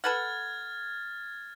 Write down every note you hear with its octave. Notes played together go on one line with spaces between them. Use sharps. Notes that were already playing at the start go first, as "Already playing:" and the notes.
A4 B4 F#5 F6 G#6 A6